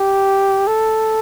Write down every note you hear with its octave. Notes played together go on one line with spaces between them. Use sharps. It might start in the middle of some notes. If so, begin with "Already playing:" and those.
Already playing: G4
A4